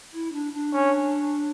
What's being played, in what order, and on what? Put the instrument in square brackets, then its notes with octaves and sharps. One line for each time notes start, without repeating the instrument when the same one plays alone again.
[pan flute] E4
D4
D4
[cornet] C#4